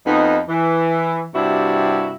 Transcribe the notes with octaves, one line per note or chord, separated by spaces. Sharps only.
F2 B3 D#4
E3
G2 C3 D4 E4 F#4